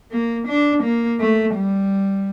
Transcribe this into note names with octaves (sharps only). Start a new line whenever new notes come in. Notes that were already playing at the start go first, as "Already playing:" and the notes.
A#3
D4
A#3
A3
G3